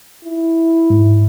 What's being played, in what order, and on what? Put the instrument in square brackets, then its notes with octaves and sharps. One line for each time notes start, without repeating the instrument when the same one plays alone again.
[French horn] E4
[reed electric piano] G#2